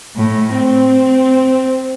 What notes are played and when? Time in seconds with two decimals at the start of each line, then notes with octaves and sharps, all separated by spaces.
0.16 A2
0.52 C4